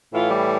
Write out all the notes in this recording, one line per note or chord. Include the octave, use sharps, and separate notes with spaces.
A2 E3 F4
G3